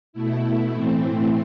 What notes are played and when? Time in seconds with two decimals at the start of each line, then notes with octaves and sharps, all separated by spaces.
0.13 B2 A3 E4
0.73 A2 E3 A3 C4